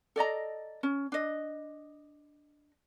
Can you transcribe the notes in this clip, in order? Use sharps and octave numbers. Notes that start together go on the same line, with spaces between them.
A4 D5 D#5 A#5
C#4
D4 D#5